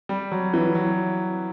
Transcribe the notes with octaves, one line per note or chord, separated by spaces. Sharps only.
G3
F#3
E3
F#3